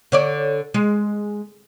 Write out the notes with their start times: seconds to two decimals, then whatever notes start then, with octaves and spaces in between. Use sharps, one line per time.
0.12 D3 C#5 D5
0.74 G#3